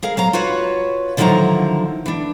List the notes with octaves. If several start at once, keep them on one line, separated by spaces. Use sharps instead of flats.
G#4 A#4 F5
F#3 F5 A#5
F4 F#4 B4 C#5
D3 D#3 F3 F#3 E4 A#5
E3 D4